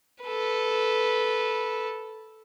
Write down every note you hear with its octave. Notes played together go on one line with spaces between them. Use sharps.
A4 B4